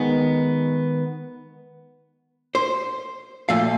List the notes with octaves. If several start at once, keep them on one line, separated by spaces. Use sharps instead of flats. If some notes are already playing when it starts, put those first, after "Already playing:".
Already playing: D#3 G#3 B3
C5
A#2 F3 A3 F5